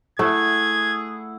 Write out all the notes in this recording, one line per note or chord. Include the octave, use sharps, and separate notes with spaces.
A3 E4 G#4 F#5 G#6